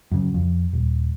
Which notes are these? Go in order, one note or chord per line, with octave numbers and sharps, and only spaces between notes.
F#2 C#3
F2
D#1